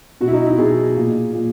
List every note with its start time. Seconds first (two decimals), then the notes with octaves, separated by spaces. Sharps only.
0.21 B2 F#4
0.28 E4
0.33 D#4
0.46 E4
0.58 B2 G#4
0.95 A#2
1.33 A#2